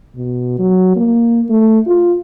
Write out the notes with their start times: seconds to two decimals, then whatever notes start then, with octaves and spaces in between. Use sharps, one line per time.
0.16 B2
0.59 F#3
0.96 A#3
1.50 A3
1.87 F4